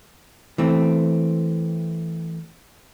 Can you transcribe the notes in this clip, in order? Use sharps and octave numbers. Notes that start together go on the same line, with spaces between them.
E3 A3 C4